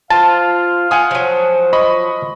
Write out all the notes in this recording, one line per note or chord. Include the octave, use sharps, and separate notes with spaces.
F4 C5 F5 A5
F4 F#5 G#5 D#6
F3 F#3 C5
D#5 B5 C#6